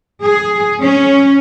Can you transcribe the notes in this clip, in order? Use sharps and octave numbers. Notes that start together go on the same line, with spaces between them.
G#4
C#4